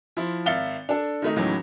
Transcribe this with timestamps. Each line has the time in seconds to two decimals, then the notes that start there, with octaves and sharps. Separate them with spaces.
0.17 F3 E4
0.46 G#1 E5 F5 A6 C#7 G7
0.89 D4 A4
1.22 D#3 A3 D#4
1.36 C#2 A2 D#3 E3 F#3